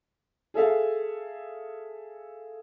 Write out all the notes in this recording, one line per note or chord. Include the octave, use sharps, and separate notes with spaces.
G#4 A4 E5 F5